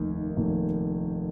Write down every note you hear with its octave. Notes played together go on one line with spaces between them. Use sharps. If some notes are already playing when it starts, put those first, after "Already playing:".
Already playing: F1 D#2 D#3 A#3
F1 D#2 D#3 A#3